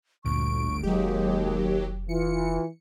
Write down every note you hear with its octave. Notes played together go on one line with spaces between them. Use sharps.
G1 D2 A#2 C#6 D7
F1 D#2 F#3 G#3 G4
E3 F4 C#7